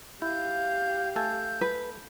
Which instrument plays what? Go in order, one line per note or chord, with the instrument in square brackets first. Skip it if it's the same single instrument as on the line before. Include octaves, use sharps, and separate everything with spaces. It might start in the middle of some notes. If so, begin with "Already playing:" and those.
[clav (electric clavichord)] E4 [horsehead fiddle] G4 F5 [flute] G6
[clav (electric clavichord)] A3 A4 G#5 [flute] G6
[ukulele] B4